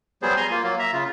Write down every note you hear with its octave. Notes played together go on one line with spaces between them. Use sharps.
F#3 G3 B3 G#4 C5
G#5 A#5 C6
A#3 F4
F#3 A#3
E5 A#5
C#3 F4